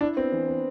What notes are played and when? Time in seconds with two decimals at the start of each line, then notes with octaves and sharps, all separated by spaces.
0.01 D4 E4
0.17 B3 C4
0.32 E3
0.47 B3